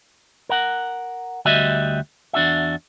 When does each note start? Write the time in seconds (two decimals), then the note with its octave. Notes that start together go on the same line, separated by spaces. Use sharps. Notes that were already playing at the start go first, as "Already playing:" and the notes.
0.49 A#4 F#5
1.45 D2 G3 F#4 D#5 E5
2.33 E2 D4 F#4 E5